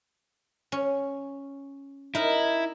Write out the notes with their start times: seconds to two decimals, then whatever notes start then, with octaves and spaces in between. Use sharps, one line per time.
0.72 C#4
2.15 D#4 E4 A#4